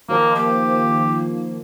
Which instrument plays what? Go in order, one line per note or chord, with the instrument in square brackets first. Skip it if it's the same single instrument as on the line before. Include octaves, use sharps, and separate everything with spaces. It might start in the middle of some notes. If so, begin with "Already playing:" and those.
[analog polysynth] D#3 F3 [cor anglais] A#3
[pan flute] A#3 [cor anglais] G4